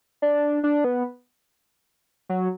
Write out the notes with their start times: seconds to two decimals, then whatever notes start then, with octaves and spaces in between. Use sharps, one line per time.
0.22 D4
0.64 D4
0.84 B3
2.29 F#3